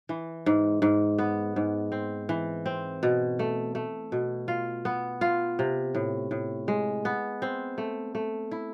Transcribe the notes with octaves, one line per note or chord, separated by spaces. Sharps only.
E3
G#2
G#2
B3
G#2
C4
E3
C4
B2
A3
A3
B2
F4
B3
F4
C3
A2
A2
G#3
B3
C4
A3
A3
E4